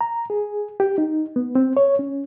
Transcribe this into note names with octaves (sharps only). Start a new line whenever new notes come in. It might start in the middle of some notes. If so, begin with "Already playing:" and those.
A#5
G#4
G4
D#4
B3
C4
C#5
C#4